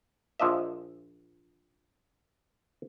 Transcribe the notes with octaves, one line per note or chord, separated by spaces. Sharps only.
A#1 F3 D4 D#5 E5